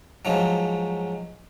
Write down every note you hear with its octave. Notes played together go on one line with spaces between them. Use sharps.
G#2 F3 F#3